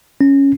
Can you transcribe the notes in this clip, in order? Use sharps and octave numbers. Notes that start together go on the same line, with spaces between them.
C#4